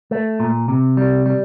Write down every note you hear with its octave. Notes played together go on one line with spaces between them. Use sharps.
A3
A#2
C3
G3
G3